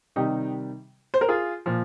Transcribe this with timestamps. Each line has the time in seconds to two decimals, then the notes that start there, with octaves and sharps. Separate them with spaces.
0.16 C3 D#3 G3 D#4 G4
1.14 C5
1.21 A#4
1.29 F4 G#4
1.66 A#2 F3